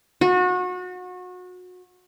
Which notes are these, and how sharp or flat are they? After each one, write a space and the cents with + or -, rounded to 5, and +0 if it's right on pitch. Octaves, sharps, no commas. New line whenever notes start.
F#4 -30